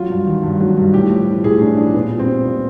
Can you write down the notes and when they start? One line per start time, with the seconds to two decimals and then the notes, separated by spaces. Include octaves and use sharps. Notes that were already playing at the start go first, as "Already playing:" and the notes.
Already playing: F#3 F4
0.10 G2
0.26 D#3
0.43 G2
0.61 F#3
0.77 G2
0.94 A2 G4
1.10 F3
1.27 F3
1.44 A2 G#4
1.60 A2 D4
1.77 F3 D4
1.94 A#2 B3
2.10 G3
2.19 C4
2.28 G3
2.45 A#2